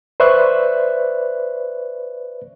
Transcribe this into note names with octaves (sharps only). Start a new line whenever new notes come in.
B4 C5 D5 E5 C#6 F#6